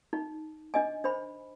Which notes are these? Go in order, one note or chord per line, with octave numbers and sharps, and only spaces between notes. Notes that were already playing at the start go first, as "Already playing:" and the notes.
D#4
D4 D#5 G#5
D4 C5 B5